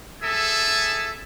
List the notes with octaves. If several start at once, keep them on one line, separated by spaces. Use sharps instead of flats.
G#4 A4 E5